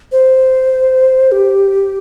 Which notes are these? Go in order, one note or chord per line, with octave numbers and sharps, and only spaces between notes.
C5
G4